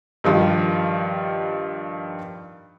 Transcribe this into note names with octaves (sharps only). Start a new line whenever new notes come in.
G2 D#3 F3 G3